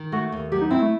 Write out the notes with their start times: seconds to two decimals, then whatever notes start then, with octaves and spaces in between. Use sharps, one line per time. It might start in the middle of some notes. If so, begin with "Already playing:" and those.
Already playing: D#3
0.12 A3 F#4
0.32 D#2
0.52 F#3 G4
0.61 D#4
0.71 C4 E4
0.82 A3